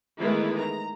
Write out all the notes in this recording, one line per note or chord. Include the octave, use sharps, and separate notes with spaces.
D#3 E3 G#3 A3 B3 E4
A#5